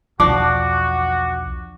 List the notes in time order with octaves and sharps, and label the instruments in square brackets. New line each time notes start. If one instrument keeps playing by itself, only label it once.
[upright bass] B1 E2 [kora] F3 D4 [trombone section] F#4 [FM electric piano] D6